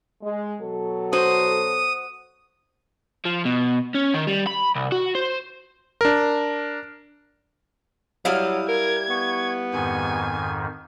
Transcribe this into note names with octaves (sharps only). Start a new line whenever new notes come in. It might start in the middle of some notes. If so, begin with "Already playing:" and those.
G#3
B2 F#3 A4
F#4 C5 D#6
F3
B2
C#4
D#3
G3
B5
C2
F#4
C5
D4 A#4
F#3 G3 E4 F5 D#6
A#4 G#6
B3 C#6
F2 G#2 D#3 G#5